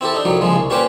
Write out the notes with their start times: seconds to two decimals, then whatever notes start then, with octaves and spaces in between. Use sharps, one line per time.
0.01 C4 E4 G4 A4
0.14 D4 D#4
0.25 C2 F2 F#3 G3
0.41 A#1 C#3 F3 G#3
0.56 C2
0.70 A#2 C#4 G4 B4 C5 D6